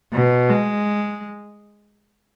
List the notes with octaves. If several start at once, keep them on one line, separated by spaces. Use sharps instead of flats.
B2
G#3